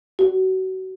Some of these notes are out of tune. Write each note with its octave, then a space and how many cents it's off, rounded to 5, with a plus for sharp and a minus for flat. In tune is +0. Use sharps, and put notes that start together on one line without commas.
F#4 +30